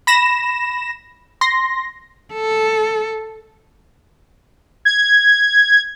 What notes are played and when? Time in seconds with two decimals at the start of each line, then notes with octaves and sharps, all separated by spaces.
0.07 B5 A#6 E7
1.41 C6 A#6
2.34 A4
4.85 G#6